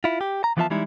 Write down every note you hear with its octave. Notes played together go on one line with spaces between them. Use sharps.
E4 F4
G4
A#5
E3 F3 B3 F4 E5 A5
E3 G3 G#3 D#4 E4